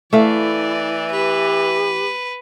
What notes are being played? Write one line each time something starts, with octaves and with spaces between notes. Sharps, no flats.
E3 A3 E4 D5 F5
G4 B4